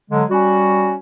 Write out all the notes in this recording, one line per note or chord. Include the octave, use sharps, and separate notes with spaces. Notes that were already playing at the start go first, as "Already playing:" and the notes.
D3 F#3 G#3
G3 C#4 F#4